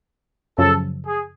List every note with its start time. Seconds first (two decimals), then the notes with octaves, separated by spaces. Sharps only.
0.58 F#2 C#3 F3 A4
1.06 G#4